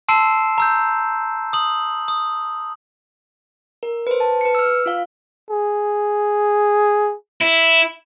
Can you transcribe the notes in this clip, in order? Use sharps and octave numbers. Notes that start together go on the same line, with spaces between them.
A5 C6 E6 C7 D7 E7
A#5 E6 G6
D#6 F#7
D#6
A#4
B4 C5
A5
B4 C#7
E6 F6
F4 F5
G#4
E4